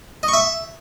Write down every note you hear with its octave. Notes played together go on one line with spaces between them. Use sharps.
D#5
C#6
E5